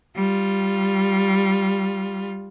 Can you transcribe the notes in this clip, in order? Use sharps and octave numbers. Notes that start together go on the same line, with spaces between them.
G3 F4